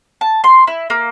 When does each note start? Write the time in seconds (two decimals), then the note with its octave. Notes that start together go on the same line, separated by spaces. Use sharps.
0.21 A5
0.44 C6
0.67 E4
0.90 A#3